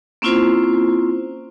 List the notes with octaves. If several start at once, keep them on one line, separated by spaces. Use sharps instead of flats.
A#3 C4 C#4 E4 F4 C5